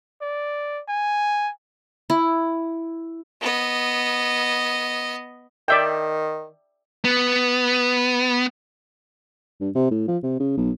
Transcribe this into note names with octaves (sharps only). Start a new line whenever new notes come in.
D5
G#5
E4
B3 D#5
D#3 D5 E5 G5
B3
G2
C3
A2
F3
C3
C#3
B1